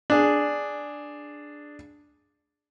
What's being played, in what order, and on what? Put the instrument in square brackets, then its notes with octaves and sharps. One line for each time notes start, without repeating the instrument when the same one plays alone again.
[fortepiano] D4 G#4